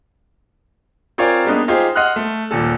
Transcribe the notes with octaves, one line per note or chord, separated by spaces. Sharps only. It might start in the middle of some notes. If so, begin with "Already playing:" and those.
C4 F4 A#4 C#5 D5 G#5
G3 G#3 A#3 B3 D4 D#4
D#4 F4 G4 G#4 C5
D#5 F#5 C6 F6 F#6
A3
D#1 A#2 A4